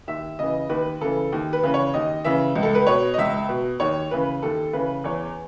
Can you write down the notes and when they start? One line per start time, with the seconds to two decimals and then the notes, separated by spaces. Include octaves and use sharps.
0.08 D#2 E5
0.39 C#3 E3 D#5
0.69 D#2 B4
1.01 C#3 E3 A4
1.32 D#2
1.53 B4
1.63 C#3 E3
1.74 C#5
1.94 D#2 D#5
2.25 C#3 E3 E5
2.56 C#2
2.63 A4
2.75 B4
2.87 B2 C#5
3.14 D#5
3.18 C#2 E5
3.49 B2
3.80 D#2 C#5
4.11 C#3 E3 B4
4.43 D#2 A4
4.73 C#3 E3 B4
5.04 E2 C#5